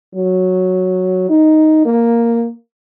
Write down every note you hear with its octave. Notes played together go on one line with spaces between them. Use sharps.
F#3
D#4
A#3